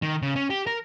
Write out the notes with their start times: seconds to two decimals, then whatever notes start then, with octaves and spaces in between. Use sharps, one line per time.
0.02 D#3
0.22 C#3
0.36 C#4
0.50 G4
0.67 A#4